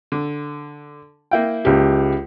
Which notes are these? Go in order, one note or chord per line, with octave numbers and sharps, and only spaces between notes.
D3
A#3 E4 G5
C#2 G4